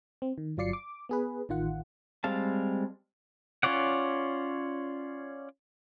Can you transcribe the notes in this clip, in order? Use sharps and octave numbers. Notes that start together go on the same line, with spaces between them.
C4
D#3
G1 F#3 F4 D5 C7 C#7
D6
B3 G#4 B4
A1 D#3 F4 F#5
G3 G#3 C4 F5 A5
C#4 F4 C#5 D5 F#5